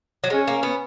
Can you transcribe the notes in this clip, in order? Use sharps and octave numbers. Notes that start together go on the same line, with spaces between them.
F#3
G#3 C#4
A#3
B3